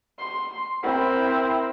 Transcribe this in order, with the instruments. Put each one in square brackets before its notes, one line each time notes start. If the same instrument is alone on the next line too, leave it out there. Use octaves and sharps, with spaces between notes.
[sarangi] C6
[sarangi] C4 [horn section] E4 A#4